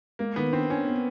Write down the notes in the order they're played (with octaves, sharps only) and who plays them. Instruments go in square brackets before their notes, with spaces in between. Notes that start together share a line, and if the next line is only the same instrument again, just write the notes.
[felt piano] G#3 [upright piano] A#3
[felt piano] D#3 [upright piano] B3
[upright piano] C4 [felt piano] D4
[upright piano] C#4 [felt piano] D4
[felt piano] B3